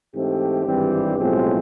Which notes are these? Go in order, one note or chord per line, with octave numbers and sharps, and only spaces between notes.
G#2 E3 A3 C4 G4
G#1 G2 E3 G3 C4
B1 A2 F3 G#3 C4